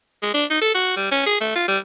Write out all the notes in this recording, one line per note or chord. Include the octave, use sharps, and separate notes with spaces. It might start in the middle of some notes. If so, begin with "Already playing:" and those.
G#3
D4
D#4
A4
F#4
G3
C#4
G#4
A3
F4
G3